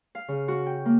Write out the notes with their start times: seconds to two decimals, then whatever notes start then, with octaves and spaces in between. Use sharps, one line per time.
0.15 F5
0.28 C#3
0.48 F#4
0.66 G5
0.85 A#3